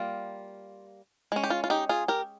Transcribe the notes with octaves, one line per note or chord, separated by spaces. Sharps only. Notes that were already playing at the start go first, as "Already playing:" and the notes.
Already playing: G3 A#3 F4
G#3 C#4
G4
F4
F4
D#4 G4
F4 G#4
G4 A#4